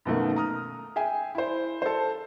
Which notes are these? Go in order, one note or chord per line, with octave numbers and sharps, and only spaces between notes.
F#2 B2 D#3 A3 A#3
A#5 D#6 F6
G#4 E5 G5 G#5
E4 C5
A4 C5